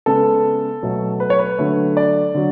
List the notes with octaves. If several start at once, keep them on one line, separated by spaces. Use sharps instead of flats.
C#3 G#3 B3 A4
B2 F#3 A3
B4
C#5
B4
D3 F#3 A3
D5
D3 F#3